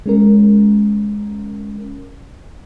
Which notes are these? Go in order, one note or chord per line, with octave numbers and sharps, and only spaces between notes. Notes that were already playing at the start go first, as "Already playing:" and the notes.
G#3 C#4 A#4